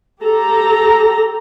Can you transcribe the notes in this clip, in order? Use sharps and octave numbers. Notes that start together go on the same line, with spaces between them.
G4 A4 A#5